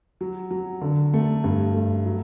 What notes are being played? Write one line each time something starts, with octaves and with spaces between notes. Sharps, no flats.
F#3
F#3
D3
A3
G2
A3
F#3